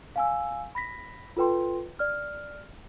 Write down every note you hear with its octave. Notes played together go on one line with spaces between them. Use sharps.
F5 G#5 E6
B5 A#6 B6
F4 A4 B4 G5 C6
D5 F6